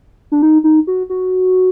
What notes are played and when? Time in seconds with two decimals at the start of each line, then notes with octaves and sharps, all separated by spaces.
0.32 D4
0.42 D#4
0.64 D#4
0.87 F#4
1.10 F#4